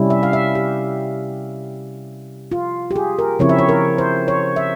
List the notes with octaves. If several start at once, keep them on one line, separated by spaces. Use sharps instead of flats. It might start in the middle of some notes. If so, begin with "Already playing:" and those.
Already playing: C3 G3 C#4 E4
E5
F5
E5
G4
F4
G4
G#4
A#4
C#3 F3 C4 E4 C#5
E5
C#5
A#4
C5
C#5
E5